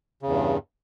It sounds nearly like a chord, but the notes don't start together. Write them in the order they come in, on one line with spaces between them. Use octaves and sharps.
C#3 E2 G2